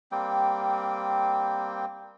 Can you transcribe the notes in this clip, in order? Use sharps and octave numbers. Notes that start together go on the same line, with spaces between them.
G3 A#3 C4 G5